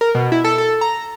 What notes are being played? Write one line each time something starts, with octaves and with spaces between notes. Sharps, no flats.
A#4
B2
E4
A4
A4
A#5